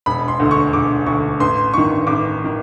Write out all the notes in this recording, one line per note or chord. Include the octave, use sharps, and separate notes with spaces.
E1 B5
C6
D2 D3
C#6
E1 D6
D2 D3 C#6
A1 C6
G2 D#3 C#6
A1 D6
D#3